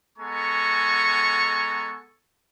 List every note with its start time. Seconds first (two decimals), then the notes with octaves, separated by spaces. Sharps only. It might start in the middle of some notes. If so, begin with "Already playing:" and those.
0.18 G#3 B3 A4 G#5 A#5 C#6